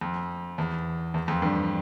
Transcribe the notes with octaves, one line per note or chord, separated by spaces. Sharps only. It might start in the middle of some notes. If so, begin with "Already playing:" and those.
F2
E2
E2
F2
G2